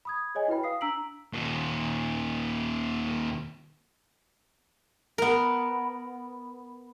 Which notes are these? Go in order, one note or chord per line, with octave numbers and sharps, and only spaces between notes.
B5 D#6 G#6
G#4 C#5 D#5 G#5
E4 F#4 B4 G5 B5
F5 D#6 C7
D4 A#5 E6 B6 D7 F#7
D#2 A#2
B3 A#4